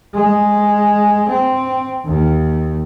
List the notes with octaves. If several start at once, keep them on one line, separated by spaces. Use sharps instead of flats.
G#3
C4
D#2